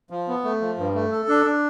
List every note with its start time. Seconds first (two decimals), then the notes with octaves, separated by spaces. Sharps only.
0.10 F3
0.28 B3
0.44 A3
0.61 F3
0.78 G2
0.94 A3
1.12 A4
1.28 D4
1.45 D4